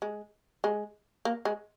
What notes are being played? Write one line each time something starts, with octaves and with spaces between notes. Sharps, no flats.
G#3
G#3
A#3
G#3